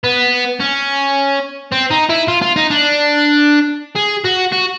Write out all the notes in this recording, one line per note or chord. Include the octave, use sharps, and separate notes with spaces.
B3
C#4
C4
D#4
E4
F4
F4
D#4
D4
G#4
F#4
F#4